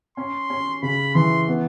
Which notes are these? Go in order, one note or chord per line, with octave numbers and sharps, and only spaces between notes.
C#4 C6
C#4
C#3 B5
E3 C6
B3